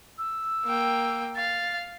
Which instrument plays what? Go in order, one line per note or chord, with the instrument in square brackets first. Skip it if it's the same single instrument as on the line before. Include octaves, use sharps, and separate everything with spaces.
[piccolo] E6
[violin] A#3 G5
[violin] F5 [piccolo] A6